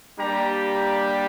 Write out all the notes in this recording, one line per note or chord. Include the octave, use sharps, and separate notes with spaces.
G3 A#3 D4 G4 A#5
A#5